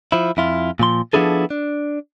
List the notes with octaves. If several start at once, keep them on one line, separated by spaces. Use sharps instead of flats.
F3 E4
F2 E4 F4
A#2 F3 C6
F3 B3 D4 E4 G#4 A4
D4